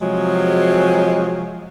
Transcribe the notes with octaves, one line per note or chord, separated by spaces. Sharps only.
C3 F3 F#3 G#3